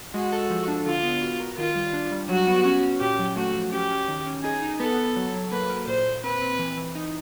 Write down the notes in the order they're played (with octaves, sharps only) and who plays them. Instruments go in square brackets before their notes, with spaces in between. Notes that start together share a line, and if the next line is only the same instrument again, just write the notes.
[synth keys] G#3 [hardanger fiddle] F#4
[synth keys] A4
F3
D4
[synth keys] D3 [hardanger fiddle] F4
[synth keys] B3
F#4
A#4
[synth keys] D#3 [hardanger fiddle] F4
[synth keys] G3
D4
G3
[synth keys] F#3 [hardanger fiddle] F#4
[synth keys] B3
C#4
C#4
[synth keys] A#2 [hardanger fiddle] G4
[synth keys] F#3
[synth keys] A3 [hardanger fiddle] F#4
[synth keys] F3
[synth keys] C#4 [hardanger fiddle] G4
[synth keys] C#4
D#3
C#4
[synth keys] D#4 [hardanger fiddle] G#4
[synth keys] D#4
[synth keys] B3 [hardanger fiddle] A4
[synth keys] B3
F#3
F#3
[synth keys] A#3 [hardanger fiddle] B4
[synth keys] A#4
[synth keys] A#2 [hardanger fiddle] C5
[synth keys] A#2
[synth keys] C4 [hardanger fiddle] B4
[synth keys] C4
E3
E3
D#4